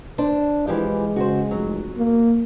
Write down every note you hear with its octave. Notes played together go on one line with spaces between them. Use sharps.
D4 C5
E3 F3 G#3 G4
C#3 F#4 C5
F1 F#3
A#3